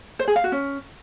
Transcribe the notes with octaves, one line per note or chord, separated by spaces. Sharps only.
C5
G#4
F5
F#4
C#4